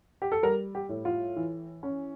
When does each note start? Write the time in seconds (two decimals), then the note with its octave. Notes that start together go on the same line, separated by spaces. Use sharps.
0.22 G4
0.32 A4
0.43 G3 A#4
0.75 G4
0.89 A2
1.05 F4
1.36 E3
1.83 C#4